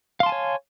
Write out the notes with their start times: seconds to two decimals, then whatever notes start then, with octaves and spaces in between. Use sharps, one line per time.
0.20 F5
0.23 C6
0.26 A5
0.29 G#5
0.32 C#5